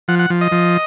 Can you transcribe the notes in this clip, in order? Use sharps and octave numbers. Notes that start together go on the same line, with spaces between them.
F3 F#5
F#5
F3
D#5
F3